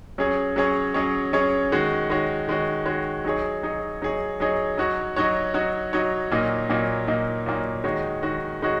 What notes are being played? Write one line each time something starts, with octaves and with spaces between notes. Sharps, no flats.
F#3 C#4 G#4 C#5
F#3 C#4 G#4 C#5
F#3 C#4 G#4 C#5
F#3 C#4 G#4 C#5
D#3 G#3 F#4 C#5
D#3 G#3 F#4 C#5
D#3 G#3 F#4 C#5
D#3 G#3 F#4 C#5
F#3 D#4 G#4 C#5
F#3 D#4 G#4 C#5
F#3 D#4 G#4 C#5
F#3 D#4 G#4 C#5
F#3 D#4 F#4 C#5
F#3 D#4 F#4 C#5
F#3 D#4 F#4 C#5
F#3 D#4 F#4 C#5
A#2 F#3 A#3 D#4
A#2 F#3 A#3 D#4
A#2 F#3 A#3 D#4
A#2 F#3 A#3 D#4
D#3 G#3 D#4 F#4 C#5
D#3 G#3 D#4 F#4 C#5
D#3 G#3 D#4 F#4 C#5